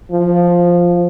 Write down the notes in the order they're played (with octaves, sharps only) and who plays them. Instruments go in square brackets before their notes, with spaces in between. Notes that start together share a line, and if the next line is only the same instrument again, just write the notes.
[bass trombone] F3